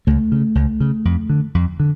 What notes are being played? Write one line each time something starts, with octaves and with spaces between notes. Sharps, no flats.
C#2 A3
C#3
C#2
C#3
F2
D3
F2
D3